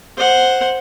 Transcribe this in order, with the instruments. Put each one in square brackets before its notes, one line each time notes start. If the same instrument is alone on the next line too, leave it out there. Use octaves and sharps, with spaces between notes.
[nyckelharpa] C5 F#5